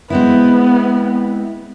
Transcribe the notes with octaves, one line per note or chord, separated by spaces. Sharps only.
G#3 B3 C4 E4